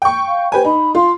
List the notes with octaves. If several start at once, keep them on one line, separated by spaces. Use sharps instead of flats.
G5 C#6
F5
G4 B4 C5 G#5
D#4 B5
F4 C6